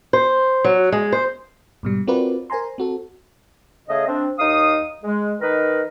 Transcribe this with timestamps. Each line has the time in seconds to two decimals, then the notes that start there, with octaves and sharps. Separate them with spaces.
0.13 C5
0.64 F#3
0.92 G#3
1.12 C5
1.83 G#2 B2 G3
2.08 C4 F4 F#4 A#4 B4 D5
2.50 A#4 C5 G#5 A#5 C6
2.78 C4 F#4 A4
3.89 C#3 A3 G#4 D#5
4.08 C4 D4
4.39 D#2 D#4 F5 D#6
5.03 G#3
5.41 D#3 D#4 A#4 B4